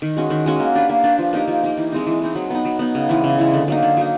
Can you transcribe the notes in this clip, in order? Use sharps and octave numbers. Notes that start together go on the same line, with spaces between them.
D#3
G#3 C#4 F#4
D#3
G#3 C#4 F#4
A#3
D4 G4 B4
A#3
D4 G4 B4
F3
A#3 D#4 G4
F3
A#3 D#4 G4
E3
G#3 C4 D#4
E3
G#3 C4 D#4
F#3
B3 D#4
F#3
B3 D#4
C#3
E3 G#3
C#3
E3 G#3
D3
F#3 A#3 D#4
D3
F#3 A#3 D#4